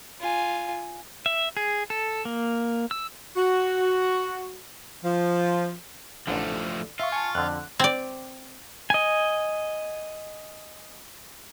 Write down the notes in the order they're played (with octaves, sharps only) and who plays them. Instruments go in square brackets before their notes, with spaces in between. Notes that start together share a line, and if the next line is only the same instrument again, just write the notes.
[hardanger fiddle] F4 G#5
[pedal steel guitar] E5
G#4
A4
A#3
E6
[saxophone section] F#4
F3
[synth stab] A1 D3 [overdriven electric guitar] F3 A3
[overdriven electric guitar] F4 [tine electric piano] E5 F5 C#6
[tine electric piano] G#5 A5 [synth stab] C#6
[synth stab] F2 D3 [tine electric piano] F#6
[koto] C4 D5
[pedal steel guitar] D#5 G#5